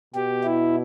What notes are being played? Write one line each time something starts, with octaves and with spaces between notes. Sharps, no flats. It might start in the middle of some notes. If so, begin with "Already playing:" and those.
B2 G4
E4